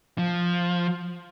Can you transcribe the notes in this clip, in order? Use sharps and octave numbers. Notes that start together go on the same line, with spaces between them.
F3